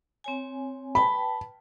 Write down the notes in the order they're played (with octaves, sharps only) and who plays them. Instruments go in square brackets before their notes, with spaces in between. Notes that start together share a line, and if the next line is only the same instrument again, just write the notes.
[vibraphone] C4 C#5 G#5
[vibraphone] B4 G5 A5 [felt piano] B5